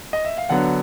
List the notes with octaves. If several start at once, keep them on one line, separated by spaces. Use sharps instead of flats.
D#5
E5
F5
D3 F#3 B3 D4 F#5